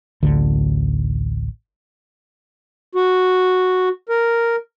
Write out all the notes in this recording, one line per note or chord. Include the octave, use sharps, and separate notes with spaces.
A1 D2 D3
F#4
A#4